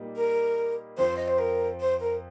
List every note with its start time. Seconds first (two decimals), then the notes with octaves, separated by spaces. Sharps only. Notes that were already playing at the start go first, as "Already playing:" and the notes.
Already playing: A#2 G3 A#3 D#4
0.16 A#4
0.97 F2 F3 C4 C5
1.16 D#5
1.28 C5
1.38 A#4
1.80 C5
2.00 A#4